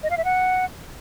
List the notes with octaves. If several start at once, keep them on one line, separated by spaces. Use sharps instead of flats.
D#5
F5
E5
F#5